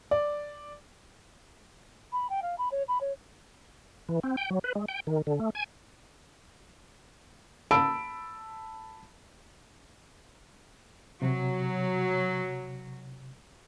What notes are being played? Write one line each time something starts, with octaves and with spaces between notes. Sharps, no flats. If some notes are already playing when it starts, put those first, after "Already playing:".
D5
B5
G5
F5
B5
C#5
B5
C#5
E3
C4
G5
F#3
B4
G#3
G5
D#3
D3
A3
G#5
A5 B5 E6 D7
C3 F#3